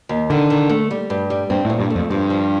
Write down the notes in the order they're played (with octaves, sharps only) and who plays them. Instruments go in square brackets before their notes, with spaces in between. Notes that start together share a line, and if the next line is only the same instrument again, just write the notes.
[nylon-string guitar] D#2
[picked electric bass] D3 [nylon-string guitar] D#3
[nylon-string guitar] D#3
A3
G3
G2
G3
[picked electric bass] G2 [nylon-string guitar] C4
[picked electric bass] A2
[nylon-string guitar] A#2
[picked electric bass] G2
[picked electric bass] F2 [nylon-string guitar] A3
[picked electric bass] G2 [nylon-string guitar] F3
[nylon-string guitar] F3